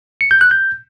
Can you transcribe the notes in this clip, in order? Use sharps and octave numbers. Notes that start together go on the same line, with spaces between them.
C#7
G6
F#6
G6